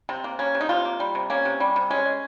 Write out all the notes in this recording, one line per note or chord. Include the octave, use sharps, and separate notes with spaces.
C3 C4
A#3
A#3 C#4
C3
D#4
C3 F4
A#3
G3
C3
A#3 C#4
C3
G3
C3
G#3 C#4
G#3